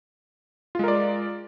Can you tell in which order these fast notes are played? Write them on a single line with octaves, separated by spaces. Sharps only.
F4 G#3 A#4 D5